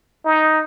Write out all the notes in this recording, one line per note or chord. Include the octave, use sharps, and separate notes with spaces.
D#4